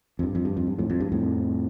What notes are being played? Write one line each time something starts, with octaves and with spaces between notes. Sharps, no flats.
F2
G2
F2
G2
F2
G2
F2 A2
F2
G2
F2 A2